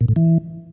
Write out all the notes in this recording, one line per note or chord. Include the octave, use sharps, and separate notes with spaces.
A#2
A2
E3